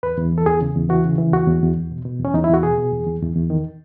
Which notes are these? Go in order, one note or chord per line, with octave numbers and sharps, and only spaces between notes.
E2 B4
E2
E3
A4
E2 G#4
C#3
E2
E3 F#4
C#3
E3
E2 F#4
E2
E2
E2
B2
B2
E2 C#4
E2 D#4
E4
E2 F#4
B2 G#4
B2
E2
E2
E2
E2
D#3